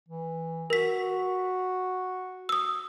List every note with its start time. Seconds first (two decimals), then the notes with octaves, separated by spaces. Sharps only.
0.09 E3
0.70 F#4 A#4 B6
2.49 D#6 E6